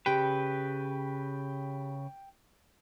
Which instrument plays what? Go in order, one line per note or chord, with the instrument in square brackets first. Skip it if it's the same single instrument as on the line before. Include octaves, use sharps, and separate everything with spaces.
[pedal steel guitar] C#3 B4 [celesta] G4 [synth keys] G5